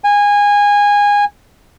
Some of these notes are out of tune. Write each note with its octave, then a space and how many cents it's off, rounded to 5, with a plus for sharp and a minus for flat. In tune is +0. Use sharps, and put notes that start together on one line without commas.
G#5 -20